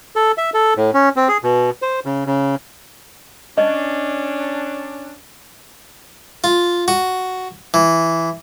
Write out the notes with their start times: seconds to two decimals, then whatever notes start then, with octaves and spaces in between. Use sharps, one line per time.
0.16 A4
0.38 E5
0.54 A4
0.77 A2
0.94 C#4
1.16 C4
1.28 G#4
1.43 B2
1.82 C5
2.05 C#3
2.27 C#3
3.58 C#4 D4 D#5
6.44 F4
6.88 F#4
7.74 E3